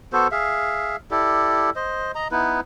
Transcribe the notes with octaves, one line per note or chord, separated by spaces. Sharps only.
B3 F#4 A4 C5
G#4 E5 F5
E4 G4 A4 D5
C5 D#5
D#5 A#5
B3 D#4 E4 B4